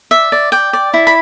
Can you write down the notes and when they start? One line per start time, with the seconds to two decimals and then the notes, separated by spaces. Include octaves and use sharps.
0.11 D5 E5
0.32 D5
0.52 D5 G5
0.73 D5
0.94 E4
1.07 B5